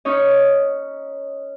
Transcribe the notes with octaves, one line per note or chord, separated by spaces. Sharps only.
C#4 D#4 C#5 D#5